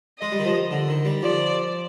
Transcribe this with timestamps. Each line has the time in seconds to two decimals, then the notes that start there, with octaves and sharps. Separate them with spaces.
0.19 G#3 D#5
0.32 G3
0.39 D#3
0.45 F3
0.71 D3
0.88 D#3
1.05 G3
1.22 F3 D5